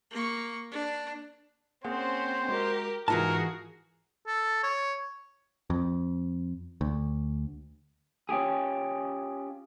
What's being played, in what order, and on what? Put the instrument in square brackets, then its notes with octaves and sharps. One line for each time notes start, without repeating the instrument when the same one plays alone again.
[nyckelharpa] A#3 C#6
D4
[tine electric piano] A#3 G#4 F#5 [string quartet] C4 C#4 [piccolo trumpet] C5
[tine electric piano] G#3 F#4 [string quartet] G4 A#4
[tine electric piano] G#2 [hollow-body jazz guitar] E3 F4 A5 [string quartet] F#4 G#4 [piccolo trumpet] A#4
[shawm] A4
C#5
[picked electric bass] F2
D2
[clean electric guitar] C#4 F4 G4 G#4